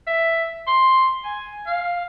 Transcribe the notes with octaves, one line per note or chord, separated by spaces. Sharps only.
E5
C6
G#5
F5